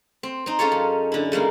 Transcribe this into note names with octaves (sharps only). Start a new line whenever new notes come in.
C4
C4 D#4
C#4 F4 G#4 A4 C#5
F#2
D3 E4
C#3 G3 G#3 A#3